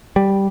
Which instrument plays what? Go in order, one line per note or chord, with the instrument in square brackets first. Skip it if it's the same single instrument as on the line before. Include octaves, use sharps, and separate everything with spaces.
[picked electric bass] G3